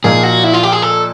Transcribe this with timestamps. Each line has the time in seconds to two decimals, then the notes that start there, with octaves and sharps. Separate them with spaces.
0.04 A#2 F3 A#3 D#4 G#4
0.23 F#4
0.44 E4
0.53 F4
0.63 G4
0.72 G#4
0.82 A4